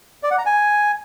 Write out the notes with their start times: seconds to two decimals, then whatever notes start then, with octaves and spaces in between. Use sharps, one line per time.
0.23 D5
0.31 F#5
0.38 A#5
0.46 G#5